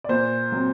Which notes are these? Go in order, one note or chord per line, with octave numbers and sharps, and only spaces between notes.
D5
A#2 C5
F#3 C4